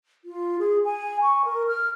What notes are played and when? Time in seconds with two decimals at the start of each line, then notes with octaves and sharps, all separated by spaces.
0.25 F4
0.59 G#4
0.84 G#5
1.22 C#6
1.45 A#4
1.68 F6